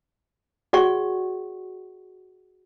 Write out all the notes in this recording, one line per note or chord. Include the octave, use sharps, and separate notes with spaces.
F#4 G#4 D5 F#5 C#6